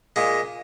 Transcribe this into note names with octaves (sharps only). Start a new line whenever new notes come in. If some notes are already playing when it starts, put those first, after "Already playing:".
A#2 G#3